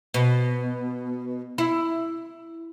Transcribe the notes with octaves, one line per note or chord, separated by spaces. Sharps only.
B2
E4